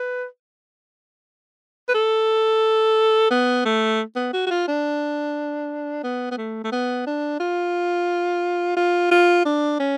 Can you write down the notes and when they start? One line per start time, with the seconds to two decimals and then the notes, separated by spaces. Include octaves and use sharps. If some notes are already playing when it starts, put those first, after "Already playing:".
Already playing: B4
1.89 B4
1.95 A4
3.31 B3
3.66 A3
4.16 B3
4.33 F#4
4.47 F#4
4.51 F4
4.68 D4
6.04 B3
6.31 B3
6.38 A3
6.64 A3
6.72 B3
7.07 D4
7.40 F4
8.77 F4
9.11 F4
9.46 D4
9.80 C#4